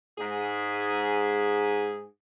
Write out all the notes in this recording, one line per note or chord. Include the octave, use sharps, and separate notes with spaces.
G#2 G#4